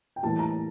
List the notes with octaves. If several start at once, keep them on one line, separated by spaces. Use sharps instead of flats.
G5
A2 E3 G3 A#3 A5
A#5